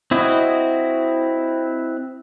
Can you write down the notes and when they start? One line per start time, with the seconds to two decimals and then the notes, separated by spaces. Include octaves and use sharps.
0.11 C4 E4 F#4 D#5